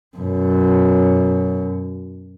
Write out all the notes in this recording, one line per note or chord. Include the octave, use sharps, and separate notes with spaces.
F#2 B2